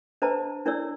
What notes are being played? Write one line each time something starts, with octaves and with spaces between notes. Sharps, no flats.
D4 B4 C5 D#5 A5 A#5
D4 E4 A#4 C#5 D5 E6